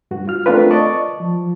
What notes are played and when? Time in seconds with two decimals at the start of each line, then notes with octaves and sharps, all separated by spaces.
0.11 G2 F#4
0.28 F4 F6
0.46 A3 C4 D4 F4 A#4 B4
0.71 D5 D#5 A5 C#6
1.20 F3